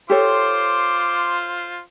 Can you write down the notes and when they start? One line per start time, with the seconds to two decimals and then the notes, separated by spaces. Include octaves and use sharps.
0.10 F4 G4 A4 C5 C#5 D6